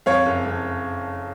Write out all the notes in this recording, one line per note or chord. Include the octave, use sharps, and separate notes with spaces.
F2 C#5 F5
F#1
F2